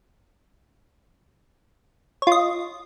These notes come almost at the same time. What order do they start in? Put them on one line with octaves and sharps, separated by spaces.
C#5 F4 D#5